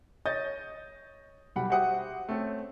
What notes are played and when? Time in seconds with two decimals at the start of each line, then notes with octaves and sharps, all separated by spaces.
0.25 C#5 D#5 D#6 G6 A6 A#6
1.56 B1 G3 F#5 B5
1.70 F#4 G4 C5 E5 F#5 D#6
2.29 A3 C4 C#4